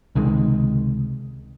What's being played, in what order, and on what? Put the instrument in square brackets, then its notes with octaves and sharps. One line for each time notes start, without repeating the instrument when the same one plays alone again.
[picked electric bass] C#2 C3 D#3 G#3